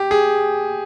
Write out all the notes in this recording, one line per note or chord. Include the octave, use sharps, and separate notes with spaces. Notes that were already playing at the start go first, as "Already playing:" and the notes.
Already playing: G4
G#4